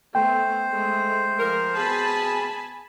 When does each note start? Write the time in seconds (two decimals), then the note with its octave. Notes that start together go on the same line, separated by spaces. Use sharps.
0.15 A3 B3 C5 G5
0.72 G#3 A3
1.39 F3 A#4
1.76 B2 C4 G#4 G#5 A5 B5